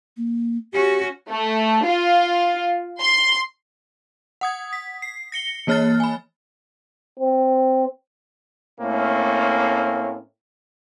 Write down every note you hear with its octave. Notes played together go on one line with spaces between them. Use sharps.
A#3
C#4 F#4 G4
A3
F4
C6
F#5 D#6 G#6
B6
C7
A#6 C#7 G7
E3 A#3 C#5 F6 F#6 A6
G#5 B5
C4
A2 A3 A#3 C4 C#4